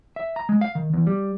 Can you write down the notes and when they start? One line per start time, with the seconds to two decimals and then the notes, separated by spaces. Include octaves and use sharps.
0.16 E5
0.36 A#5
0.49 G#3
0.61 F5
0.75 D#3
0.93 E2
1.07 G3